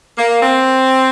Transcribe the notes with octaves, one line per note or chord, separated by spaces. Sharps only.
A#3
C4